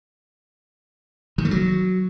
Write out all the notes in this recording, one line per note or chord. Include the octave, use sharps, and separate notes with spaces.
D#3
A3
F#3